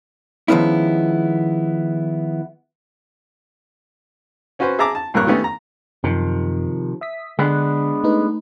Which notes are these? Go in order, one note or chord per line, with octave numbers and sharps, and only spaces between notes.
D#3 F3 G#3 B3 C#4 E4
C4 C#4 F#4 B4 C5
G#4 E5 A5 A#5 D6
A5
A#1 G2 A#2 A#4 C#5 F#6
D#3 G3 A3 B3 C#4
A#5
F#2 C3 D#3 F3
E5 D#6 B6
D3 G#3 B3 D4
A3 D#4 B4